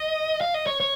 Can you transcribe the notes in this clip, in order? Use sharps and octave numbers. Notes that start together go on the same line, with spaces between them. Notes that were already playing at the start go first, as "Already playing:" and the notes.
Already playing: D#5
F5
D#5
C#5
C#5